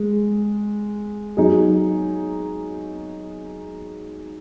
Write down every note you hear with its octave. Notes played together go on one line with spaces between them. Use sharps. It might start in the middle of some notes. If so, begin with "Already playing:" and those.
Already playing: G#3
F#3 D#4 G#4